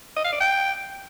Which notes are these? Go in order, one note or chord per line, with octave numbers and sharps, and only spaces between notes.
D#5
F5
D5
G5